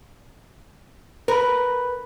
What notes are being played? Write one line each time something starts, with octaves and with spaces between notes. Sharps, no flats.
A#4 B4 B5